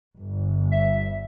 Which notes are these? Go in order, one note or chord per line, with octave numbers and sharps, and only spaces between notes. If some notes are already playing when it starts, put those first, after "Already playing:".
G1
E5